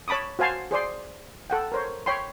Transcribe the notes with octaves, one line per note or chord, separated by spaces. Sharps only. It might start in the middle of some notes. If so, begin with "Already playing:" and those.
C#5 A5 B5 D6 D#6
F#4 C5 F5 G#5 A5 C6
G#4 C5 D5 C6
A4 F#5 G5
A#4 C5 C#5
C#5 G5 B5 C6